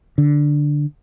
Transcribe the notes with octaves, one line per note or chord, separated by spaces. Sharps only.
D3